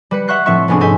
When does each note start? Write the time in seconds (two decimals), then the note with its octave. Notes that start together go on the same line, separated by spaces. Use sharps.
0.11 G3 B4 C#7
0.27 E5 F#5 C#6 F#6 G6 C7
0.46 A2 F3 C4 E5 C#6 C#7
0.68 F1 B3 C#4 D4 G#4 C#6
0.80 G#2 C#4 A4 G#5 G6 B6